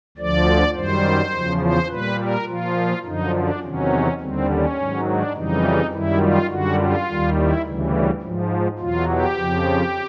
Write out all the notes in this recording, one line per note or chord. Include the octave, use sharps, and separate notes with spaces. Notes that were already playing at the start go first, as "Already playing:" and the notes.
D2 D3 F3 D5
F#2 D#3 G3 C5
E2 C#3 F3
C5
A#2 G3 B4
A#4
A#2 F3 F4
F#2 D3 F3 D#4
D4
E2 C3 D#3 F#3 C#4
D#2 D3 G3 C4
C#4
G#2 D#3 F#3
D4
F2 C#3 E3 G3 D#4
F#2 D#3 G3 E4
F4
F#2 D3 G3 F#4
F4
D#2 D#3 G3
E4
D2 C#3 E3 G3
G#2 F3
E2 B2 F#3 F4
G4
F2 C#3 F3